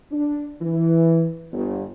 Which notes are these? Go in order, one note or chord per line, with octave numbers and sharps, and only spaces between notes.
D4
E3
G1